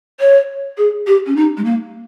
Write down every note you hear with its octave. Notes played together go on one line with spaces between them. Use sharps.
C#5
G#4
G4
C#4
D#4
G#3
A#3